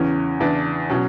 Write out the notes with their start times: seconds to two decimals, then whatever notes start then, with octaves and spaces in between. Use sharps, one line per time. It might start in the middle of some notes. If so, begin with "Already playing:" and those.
Already playing: E2 C#3 E3 C#4
0.40 E2 C#3 E3 D4
0.89 B2 F#3 C#4